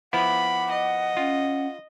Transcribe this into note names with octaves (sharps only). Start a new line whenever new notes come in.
F3 B3 E4 F#5 B5 D6
D#5
C#4 F4